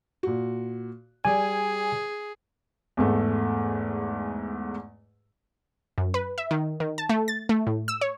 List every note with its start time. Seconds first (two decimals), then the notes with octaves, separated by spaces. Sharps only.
0.23 A#2 F#4
1.25 G3 G#4 D5 G#5
2.97 E2 G#2 A3
5.98 F#2
6.14 B4
6.38 E5
6.51 D#3
6.80 D#3
6.98 A5
7.09 A3
7.28 A6
7.49 A3
7.67 A2
7.88 E6
8.01 C#5